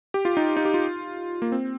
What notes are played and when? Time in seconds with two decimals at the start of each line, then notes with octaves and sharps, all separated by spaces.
0.14 G4
0.25 F4
0.37 D#4
0.57 D#4
0.65 G4
0.74 F4
1.42 A#3
1.52 C4